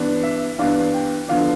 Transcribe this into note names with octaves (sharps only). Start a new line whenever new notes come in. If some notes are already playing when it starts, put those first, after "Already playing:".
Already playing: G2 E3 B3 D4
E5
G2 E3 B3 D4 F5
G5
D3 F3 B3 D4 F5